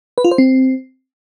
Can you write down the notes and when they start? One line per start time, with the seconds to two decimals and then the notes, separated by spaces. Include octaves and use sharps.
0.18 B4
0.24 F4
0.31 C5
0.38 C4